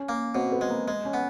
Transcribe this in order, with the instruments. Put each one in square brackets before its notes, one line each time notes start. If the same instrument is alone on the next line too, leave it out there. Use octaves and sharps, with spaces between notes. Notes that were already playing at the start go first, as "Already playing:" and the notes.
Already playing: [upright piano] C#4
[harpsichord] A#3
[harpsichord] B2 [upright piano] C4
[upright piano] B3
[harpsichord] G#3
[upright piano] A#3
[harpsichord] G#3
[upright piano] C#4
[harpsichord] B3